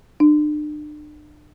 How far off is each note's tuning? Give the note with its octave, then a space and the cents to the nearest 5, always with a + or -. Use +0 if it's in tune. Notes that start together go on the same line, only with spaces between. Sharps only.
D4 +40